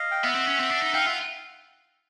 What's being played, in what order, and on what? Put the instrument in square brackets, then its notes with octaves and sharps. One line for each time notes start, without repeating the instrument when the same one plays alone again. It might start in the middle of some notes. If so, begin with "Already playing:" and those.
Already playing: [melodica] D#5 F5
G5
[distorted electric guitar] B3 [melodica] E5 F#5
[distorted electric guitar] C4
C#4
C4
D4
D#4
[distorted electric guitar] D#4 [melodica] F5 G5
[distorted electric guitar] F4 [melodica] E5 F#5